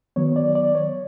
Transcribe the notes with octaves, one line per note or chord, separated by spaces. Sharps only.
D#3 F#3 B3 C#5
D5
D5
C#5